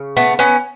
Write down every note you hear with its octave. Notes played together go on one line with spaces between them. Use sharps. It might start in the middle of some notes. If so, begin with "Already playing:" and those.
Already playing: C#3
A3 B3
B3 C#4